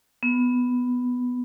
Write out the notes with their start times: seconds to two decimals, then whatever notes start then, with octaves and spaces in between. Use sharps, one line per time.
0.23 B3